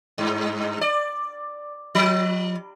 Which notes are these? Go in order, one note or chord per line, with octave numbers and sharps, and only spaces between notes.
G2
D5
F3